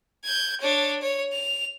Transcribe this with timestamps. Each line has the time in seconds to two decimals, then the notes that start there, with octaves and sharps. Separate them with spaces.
0.24 G6 G#6
0.61 D4 C#5
1.01 C#5
1.32 F7